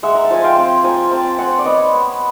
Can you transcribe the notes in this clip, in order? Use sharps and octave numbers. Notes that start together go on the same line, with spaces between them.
G#3 E5 F#5
A#5
A5
F3 G#5
F5 G5
C4
F3 G#5 A#5
C4 G5 A5
C4 F#5 G#5
D5
B3 C#5 D#5
B3